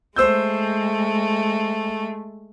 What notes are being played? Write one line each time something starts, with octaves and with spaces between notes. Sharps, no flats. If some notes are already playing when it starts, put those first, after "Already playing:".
G#3 A3 C5 E6 G6